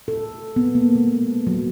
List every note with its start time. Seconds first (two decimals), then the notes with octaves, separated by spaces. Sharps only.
0.08 A4
0.56 B3
0.75 A#3
0.95 G#3
1.47 F#3